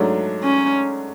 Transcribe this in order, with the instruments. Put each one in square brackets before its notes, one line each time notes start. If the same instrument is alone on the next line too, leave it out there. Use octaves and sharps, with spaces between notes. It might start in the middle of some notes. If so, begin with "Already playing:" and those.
Already playing: [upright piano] G#2 F#3 A3 D4
[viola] C#4